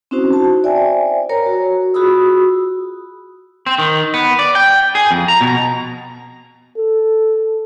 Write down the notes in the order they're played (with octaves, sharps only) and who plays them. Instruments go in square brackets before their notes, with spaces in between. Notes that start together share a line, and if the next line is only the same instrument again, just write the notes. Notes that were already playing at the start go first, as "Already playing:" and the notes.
[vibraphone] C4 C#4 D#4 E4 F#4 C5
F#4 A5
C5 D5 E5 G5 G#5
A#4 C#5 A#5
F#4
F4 F#4 G#4 B5 D#6 E6
[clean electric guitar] C4
D#3
B3
D5
G5
G#4
F2
A#5
B2
[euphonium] A4